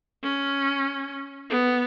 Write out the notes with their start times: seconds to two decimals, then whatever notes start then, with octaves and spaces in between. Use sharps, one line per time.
0.24 C#4
1.50 B3